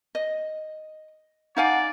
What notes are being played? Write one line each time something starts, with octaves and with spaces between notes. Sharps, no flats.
D#5
D#4 D5 F5 F#5 G#5